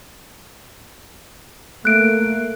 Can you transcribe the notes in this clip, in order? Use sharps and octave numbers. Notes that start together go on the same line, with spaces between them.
A3 A#3 F#6 D7